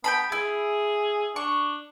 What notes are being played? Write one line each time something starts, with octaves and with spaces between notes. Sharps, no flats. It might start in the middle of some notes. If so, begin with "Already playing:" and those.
B3 G5 A#5 B5
E4 G#4
D4 C#6